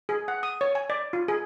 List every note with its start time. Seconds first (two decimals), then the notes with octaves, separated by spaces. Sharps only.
0.09 G#4
0.28 F#5
0.43 D#6
0.61 C#5
0.75 G#5
0.90 D5
1.13 F4
1.28 G#4